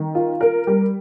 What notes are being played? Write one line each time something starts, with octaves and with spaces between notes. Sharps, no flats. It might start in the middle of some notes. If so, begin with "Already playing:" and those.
Already playing: D#3
F4
A#4
G3